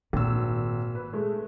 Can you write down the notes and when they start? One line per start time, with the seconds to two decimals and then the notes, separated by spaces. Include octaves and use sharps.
0.13 G#1 A#2 E6
0.95 B4
1.13 G#3 A3